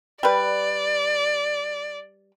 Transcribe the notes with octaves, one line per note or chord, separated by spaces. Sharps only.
G3 B4 D5